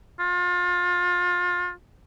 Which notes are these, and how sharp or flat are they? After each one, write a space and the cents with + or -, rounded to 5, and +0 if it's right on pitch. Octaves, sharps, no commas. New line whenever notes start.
F4 +30